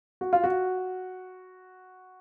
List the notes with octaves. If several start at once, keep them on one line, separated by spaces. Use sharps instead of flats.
F#4
F4
F#4